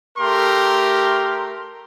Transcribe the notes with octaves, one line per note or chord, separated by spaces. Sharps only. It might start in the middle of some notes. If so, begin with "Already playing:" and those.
A3 G4 A#4 C6